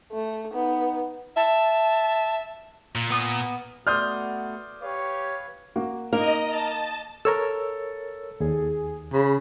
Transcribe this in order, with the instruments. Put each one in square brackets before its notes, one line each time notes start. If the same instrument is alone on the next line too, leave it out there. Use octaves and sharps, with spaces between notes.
[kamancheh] A3
B3 D#4
[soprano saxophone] E5 [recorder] A5
[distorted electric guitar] A#2
[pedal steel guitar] B3 D#6
[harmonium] A3 B3 F#4 [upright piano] D5 C6 D#6 [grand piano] F6 G6
[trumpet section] G4 C#5 [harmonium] B4 F5
[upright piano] A#3 F#4
[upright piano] A#3 D#4 [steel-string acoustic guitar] A#4 [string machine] D#5
[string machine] A5
[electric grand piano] A4 [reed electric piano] A#4 C#5 E6
[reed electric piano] D#2 [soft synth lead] G#4
[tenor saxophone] C#3 [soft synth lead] B5